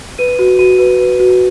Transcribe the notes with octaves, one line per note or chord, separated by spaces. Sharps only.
B4 D#7
F#4
F#4 D#7
B4
B4
F#4